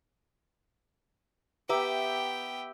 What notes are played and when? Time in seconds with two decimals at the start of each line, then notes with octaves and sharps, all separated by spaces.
1.69 B3 G4 B4 E5 G5 A#5